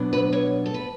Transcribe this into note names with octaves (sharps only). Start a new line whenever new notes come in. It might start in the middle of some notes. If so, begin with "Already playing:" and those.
Already playing: B2 F#3 B3 D4
B4
C#5
A4
B4